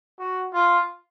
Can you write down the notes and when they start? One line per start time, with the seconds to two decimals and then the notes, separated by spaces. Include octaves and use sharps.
0.19 F#4
0.54 F4